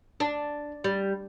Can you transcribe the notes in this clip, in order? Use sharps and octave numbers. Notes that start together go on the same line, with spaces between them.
D4
G3